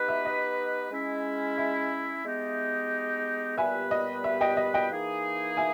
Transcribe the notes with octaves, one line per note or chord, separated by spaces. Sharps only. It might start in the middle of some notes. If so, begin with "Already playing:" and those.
Already playing: B3 D#4 G4 B4
E5
D#5
G#3 C#4 E4
E5
G#3 B3 D#4 G4
A#2 G3 B3 G4 B4 E5 G#5
D#5
E5
D#5 G5
D#5
D#5 G5
E3 A#3 D#4 G#4
E5 G#5